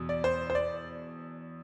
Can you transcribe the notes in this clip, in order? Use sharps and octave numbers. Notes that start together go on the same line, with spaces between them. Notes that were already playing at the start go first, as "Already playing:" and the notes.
Already playing: E2 B2
D5
C5
C5
D5